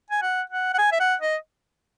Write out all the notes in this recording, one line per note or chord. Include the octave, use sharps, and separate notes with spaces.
G#5
F#5
F#5
F#5
G#5
E5
F#5
D#5